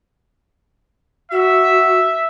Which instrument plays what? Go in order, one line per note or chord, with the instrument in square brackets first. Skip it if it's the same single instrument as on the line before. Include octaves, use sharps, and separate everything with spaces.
[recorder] F#4 [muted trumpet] E5